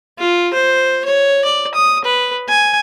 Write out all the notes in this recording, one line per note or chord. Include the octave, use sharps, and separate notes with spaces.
F4
C5
C#5
D5
D#6
B4
G#5